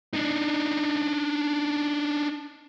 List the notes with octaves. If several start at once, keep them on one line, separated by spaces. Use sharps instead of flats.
D4 D#4